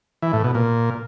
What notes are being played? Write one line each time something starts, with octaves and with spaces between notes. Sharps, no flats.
E3
A2
B2
A#2